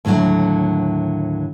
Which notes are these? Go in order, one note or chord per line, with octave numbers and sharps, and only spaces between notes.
D#2 A2 D3 E3 F#3